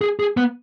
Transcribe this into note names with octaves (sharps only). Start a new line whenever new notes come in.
G#4
G#4
B3